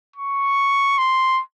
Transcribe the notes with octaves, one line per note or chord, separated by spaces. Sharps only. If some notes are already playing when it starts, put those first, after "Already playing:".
C#6
C6